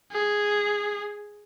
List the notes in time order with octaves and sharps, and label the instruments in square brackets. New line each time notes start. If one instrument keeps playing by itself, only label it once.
[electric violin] G#4